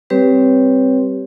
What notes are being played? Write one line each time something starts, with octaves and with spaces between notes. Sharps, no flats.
G3 C4 G4 B4 C#5